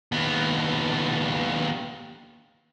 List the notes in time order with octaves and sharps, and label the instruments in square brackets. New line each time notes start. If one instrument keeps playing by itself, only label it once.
[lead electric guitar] D#2 B3